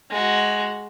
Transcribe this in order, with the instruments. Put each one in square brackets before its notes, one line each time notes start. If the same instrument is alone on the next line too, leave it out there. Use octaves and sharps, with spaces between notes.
[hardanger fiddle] G#3 F#4